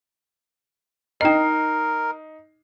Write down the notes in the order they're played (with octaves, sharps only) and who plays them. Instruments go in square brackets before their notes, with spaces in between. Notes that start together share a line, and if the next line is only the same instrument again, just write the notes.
[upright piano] D#4 C7 [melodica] A#4 [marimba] D#5 G5